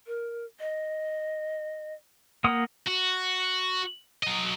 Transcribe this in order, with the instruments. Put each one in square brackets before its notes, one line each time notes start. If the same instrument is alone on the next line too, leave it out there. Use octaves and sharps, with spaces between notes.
[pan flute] A#4
D#5
[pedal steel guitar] A#3 F#5 D#6
[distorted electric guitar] F#4
F#3 D#5